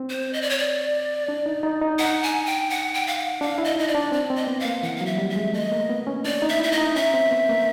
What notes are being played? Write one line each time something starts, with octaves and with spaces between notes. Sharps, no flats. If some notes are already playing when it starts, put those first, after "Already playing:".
Already playing: C4
C5
D#5
D5
C#5
D5
D4
D#4
D#4
D#4
D#4 F#5
G#5
G5
F#5
G5
F5
F#5
D4 F5
E4
D#5
D#4 D#5
D5
D4
C4 D5
C4
D#5
B3
F5
A#3
E3 F#5
F#3 F5
E5
G3
E5
G#3
A3 D#5
A#3
B3
C#4
D4 D5
D#4
E5
E4 E5
D#5
D#4
C#4 E5
C4
B3
A#3